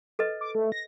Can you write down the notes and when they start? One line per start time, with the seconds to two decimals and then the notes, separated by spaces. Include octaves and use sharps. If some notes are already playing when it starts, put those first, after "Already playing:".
0.19 A4 B4 D#5
0.41 D6
0.55 A3
0.72 A#6